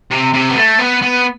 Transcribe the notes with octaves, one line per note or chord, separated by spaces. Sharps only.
C3
C3
B3
A3
B3
B3